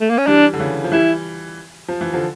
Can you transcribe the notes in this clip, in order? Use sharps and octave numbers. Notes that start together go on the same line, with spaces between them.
A3
A#3
C#4
E3 G3 D4
D3
C#3 E3
F3
E3 G3 E4
F3
E3
D3 F3